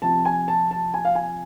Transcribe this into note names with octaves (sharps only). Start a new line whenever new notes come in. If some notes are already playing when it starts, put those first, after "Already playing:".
C3 F3 A5
G#5
A5
A5
G#5
F5
G#5